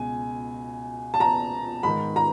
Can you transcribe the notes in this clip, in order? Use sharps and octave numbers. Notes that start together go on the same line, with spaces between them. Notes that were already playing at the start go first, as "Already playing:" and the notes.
Already playing: C#2 B2 G#5
A5
A#5
G#2 D#3 B5
A#5